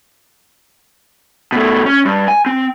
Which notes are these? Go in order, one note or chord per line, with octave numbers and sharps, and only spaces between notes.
B2 A3
C#4
G2
G#5
C4